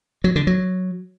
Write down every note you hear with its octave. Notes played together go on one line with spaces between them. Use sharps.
F#3
D3
F#3